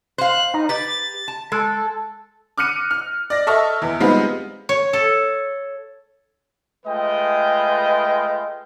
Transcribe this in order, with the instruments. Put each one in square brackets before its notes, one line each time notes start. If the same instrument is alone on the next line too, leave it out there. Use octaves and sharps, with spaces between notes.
[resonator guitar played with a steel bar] C5 F5 [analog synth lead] F#6
[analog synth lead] D#4
[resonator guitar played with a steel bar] G4 B4 [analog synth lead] A6
[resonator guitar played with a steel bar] A5
[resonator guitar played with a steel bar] G#3 [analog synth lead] A4
[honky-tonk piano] D6 F6 F#6 C#7 D#7
F6
D5 A#6
A4 D#5 E5 A5 C#6 F6
E2 E3
G3 G#3 B3 C4 D#4 F4
[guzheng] C#5
A4
[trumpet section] G#3 A3 F4 B4 D#5 G5